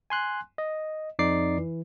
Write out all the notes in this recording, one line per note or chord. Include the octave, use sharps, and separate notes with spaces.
G#5 C6 F#6
D#5
F2 D#4 D5 D6 C7
E3